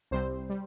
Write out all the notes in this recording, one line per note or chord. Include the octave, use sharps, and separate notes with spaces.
C2 C3 G3 C4 C5
G3